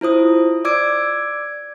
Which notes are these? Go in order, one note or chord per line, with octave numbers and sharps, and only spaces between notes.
E4 F4 C5 D#6
D5 D6 E6 G#6 D7